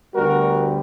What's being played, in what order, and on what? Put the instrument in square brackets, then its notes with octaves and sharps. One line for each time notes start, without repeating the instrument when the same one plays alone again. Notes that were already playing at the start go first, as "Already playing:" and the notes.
[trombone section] D2 D3 G3 B3 F#4 A#4